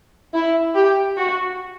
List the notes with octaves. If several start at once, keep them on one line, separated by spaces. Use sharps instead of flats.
E4
G4
F#4